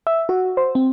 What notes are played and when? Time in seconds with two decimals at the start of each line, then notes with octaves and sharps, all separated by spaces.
0.07 E5
0.29 F#4
0.57 C5
0.75 C4